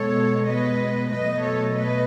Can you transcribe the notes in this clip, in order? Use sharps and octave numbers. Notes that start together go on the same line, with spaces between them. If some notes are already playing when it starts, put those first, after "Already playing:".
Already playing: B2 G#3 A4 C#5
B4 D#5
B2 F#3 A3 B4 D#5
A4 C#5
B4 D#5